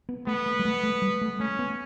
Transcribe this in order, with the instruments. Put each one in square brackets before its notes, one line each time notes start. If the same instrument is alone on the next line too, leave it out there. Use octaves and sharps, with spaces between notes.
[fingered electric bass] B3
[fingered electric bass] A3 [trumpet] B3
[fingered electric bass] A3
G3
A3
A3
G3
A3
[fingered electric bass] A3 [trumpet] C#4
[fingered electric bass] B3